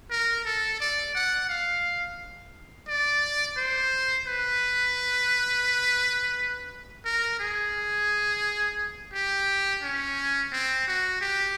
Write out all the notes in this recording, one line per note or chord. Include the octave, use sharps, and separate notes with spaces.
A#4
A4
D5
F#5
F5
D5
C5
B4
A#4
G#4
G4
C#4
C4
F#4
G4